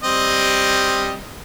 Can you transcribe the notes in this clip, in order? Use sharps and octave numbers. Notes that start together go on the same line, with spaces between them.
G3 C4 D#5